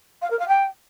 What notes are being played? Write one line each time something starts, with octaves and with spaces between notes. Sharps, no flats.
F5
A#4
F5
G5